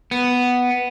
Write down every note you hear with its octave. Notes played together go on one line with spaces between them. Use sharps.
B3